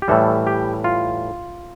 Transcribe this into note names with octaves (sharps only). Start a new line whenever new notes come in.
G4
A2 E3 G3 A4
G4
F4